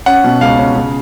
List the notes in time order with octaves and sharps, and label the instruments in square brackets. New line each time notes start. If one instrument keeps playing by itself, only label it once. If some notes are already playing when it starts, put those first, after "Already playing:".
[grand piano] C#4 F#5
B2
C#2 F5
C#4
C#3